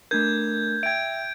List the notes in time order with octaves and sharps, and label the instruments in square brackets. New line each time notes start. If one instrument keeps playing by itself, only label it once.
[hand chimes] A3 D4 A#4 [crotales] G6 G#6
[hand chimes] E5 G5 [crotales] G#6 D7